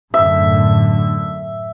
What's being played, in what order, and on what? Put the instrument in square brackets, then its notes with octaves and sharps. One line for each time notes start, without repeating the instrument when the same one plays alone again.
[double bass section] F#2 A2 D3 [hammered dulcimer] E5